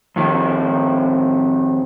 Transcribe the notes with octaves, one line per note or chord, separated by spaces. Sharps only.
F2 D#3